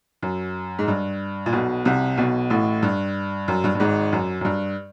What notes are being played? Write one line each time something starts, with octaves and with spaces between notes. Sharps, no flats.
F#2
G#2
G2
A#2
B1 B2
C2 C3
B1 B2
A1 A2
G2
F#2
G2
G2
G#1 G#2
F#2
F#2
G2